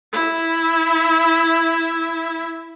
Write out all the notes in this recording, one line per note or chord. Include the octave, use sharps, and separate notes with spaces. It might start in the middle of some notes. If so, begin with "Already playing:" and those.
E4 E5